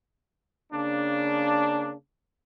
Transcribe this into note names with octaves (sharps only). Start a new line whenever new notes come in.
C#3 A#3 D4